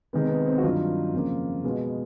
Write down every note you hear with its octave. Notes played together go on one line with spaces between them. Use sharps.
C3 D#3 G#3 B3
B3
C4
F#4
G2 D#3 F#3 F4
F2 C#3 F3 A#3
B2 G#3 B3